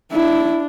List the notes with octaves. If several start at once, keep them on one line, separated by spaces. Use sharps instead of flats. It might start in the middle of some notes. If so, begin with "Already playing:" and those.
D4 E4